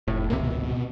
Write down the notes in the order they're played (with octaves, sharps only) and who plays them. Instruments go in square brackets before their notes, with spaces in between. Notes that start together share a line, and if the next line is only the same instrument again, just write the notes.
[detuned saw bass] F1 [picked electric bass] A2
[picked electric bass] G#1 C#2 C3 [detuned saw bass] A#3
[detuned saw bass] B2